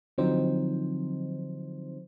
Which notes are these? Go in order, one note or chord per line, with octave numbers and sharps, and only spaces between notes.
D3 F3 F#3 C4 D#4 C5